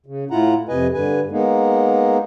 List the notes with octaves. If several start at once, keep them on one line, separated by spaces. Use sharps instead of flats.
C#3
A2 E4 F4 F#5 A#5
F2 C3 B4 D#5 G#5
G2 D3 B4 G#5
G#3 A#3 B3 D#4